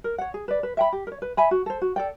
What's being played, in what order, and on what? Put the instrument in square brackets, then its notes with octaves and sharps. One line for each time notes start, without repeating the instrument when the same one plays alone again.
[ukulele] A#4
C#5 F#5
G#4
B4 D5
B4
E5 G5 B5
G4
A#4
C#5
B4
E5 G#5 B5
F#4
A4 C5
F#4
A4 D5 G5